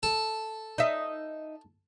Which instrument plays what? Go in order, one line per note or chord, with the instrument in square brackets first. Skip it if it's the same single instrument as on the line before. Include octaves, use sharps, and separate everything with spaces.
[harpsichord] A4 A5
[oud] D#4 E5